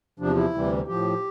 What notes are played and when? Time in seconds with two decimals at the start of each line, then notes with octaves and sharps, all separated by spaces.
0.20 E2 C3 F3 D4
0.36 E4
0.54 D2 C3 E3 G3
0.87 A2 F3 G4